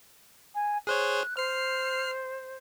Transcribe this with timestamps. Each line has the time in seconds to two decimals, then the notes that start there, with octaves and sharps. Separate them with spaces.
0.55 G#5
0.87 G#4 C5 C#5 F#6
1.37 C5 F6 C7